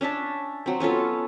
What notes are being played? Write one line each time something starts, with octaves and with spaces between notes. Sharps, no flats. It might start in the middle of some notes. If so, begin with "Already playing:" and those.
C#4 D4 E5 A5
F#3 C4
B3 C#4 F4 A4